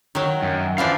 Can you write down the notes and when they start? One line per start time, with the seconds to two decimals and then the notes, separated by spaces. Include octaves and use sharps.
0.15 D#3 F#3
0.43 F#2
0.78 E3 F3 D4 F5